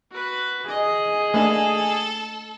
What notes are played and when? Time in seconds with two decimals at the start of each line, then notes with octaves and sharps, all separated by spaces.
0.10 F#4 B4
0.69 G#4 D#5
1.34 A3 A#3 D4 A4